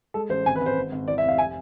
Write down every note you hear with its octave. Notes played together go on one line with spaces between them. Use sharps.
G#3 A4
A1 C5
G#1 G#5
B4
G#1
C5
G#1
G#1
E3 D5
E5
F1
F5
G#5